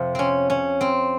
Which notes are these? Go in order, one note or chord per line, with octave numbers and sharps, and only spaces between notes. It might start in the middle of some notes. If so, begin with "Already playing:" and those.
Already playing: F2 C3 F3
C4 C#4
C#4
C4